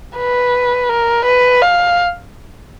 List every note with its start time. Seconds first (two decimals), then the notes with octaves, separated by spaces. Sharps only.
0.17 B4
0.89 A#4
1.25 B4
1.61 F5